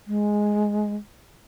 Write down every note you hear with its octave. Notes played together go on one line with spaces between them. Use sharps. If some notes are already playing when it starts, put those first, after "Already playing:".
G#3